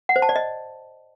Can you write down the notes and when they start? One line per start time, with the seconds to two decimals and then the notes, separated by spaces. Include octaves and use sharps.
0.09 F#5
0.16 C5
0.22 A5
0.29 D5
0.36 D#5